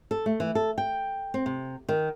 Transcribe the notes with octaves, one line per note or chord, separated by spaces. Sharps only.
A4
A3
E3
A4
G5
C4
C3
D#3